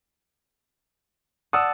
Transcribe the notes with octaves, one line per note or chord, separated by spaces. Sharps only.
D5 F#5 A5 D#6 E6